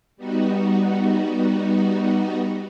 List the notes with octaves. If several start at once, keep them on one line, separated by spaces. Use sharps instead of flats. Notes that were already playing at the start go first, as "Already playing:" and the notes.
G3 B3 D#4 F#4